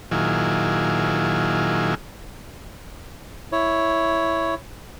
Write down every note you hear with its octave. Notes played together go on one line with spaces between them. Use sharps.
A#2 D#3 F#3 E4 F4 G#4
E4 C#5